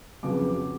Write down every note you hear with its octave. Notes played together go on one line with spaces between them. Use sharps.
F2 C#3 F#3 B3 D6